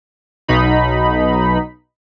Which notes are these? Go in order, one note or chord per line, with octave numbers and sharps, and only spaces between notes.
B1 B2 D#4 B5